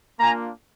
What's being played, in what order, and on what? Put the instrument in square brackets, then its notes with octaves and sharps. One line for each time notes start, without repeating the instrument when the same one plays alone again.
[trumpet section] A#3 D4 F4 G#5 A#5